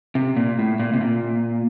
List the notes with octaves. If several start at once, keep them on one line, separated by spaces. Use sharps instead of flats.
C3
A#2
A2
A#2
C3
A#2